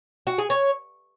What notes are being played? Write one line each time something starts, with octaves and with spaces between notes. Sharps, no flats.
F#4
G#4
C#5